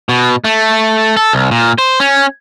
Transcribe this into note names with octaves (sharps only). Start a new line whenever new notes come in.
B2
A3
A4
C2
A#2
C5
C#4